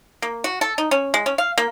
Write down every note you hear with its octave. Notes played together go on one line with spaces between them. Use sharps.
A#3
F#4
A4
D#4
C#4
G#3
C#4
F5
A#3